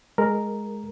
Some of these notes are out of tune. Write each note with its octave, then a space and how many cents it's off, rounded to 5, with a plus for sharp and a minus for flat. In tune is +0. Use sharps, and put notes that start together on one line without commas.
G#3 +0 A#4 +0